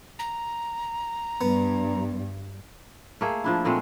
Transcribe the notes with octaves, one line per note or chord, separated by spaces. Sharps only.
A#5
G2 B3
A3 A#3 G#4
F3 D4 E4
A#2 G#3 A3 C4